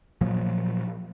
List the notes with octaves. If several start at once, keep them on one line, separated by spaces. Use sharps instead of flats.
A#2 F3 F#3 A#3